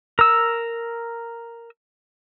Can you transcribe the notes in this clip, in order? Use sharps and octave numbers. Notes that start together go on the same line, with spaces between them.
A#4 E6